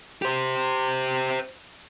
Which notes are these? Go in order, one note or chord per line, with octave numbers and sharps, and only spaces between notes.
G4 C5